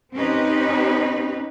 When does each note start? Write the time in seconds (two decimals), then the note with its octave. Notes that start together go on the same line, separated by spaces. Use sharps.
0.14 C4 C#4 D#4 G4 B4